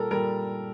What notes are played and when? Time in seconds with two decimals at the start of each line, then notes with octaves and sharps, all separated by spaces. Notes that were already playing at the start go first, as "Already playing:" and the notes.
Already playing: A#2 G3 A4 A#4
0.11 A#2 G3 A#4